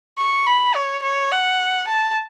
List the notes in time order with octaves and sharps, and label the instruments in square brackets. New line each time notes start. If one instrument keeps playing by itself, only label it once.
[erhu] C#6
B5
C#5
C#5
F#5
A5